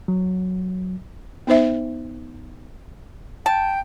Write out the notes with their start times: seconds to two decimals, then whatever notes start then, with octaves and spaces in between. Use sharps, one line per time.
0.08 F#3
1.47 B3 D#4 C5 E5
3.46 G5 A5